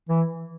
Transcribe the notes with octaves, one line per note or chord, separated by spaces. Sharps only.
E3